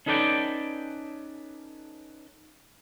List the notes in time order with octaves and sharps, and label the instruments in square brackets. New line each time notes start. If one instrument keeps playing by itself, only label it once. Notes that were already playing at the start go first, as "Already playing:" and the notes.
[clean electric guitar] C#4 D#4 A4 B4 D5 G5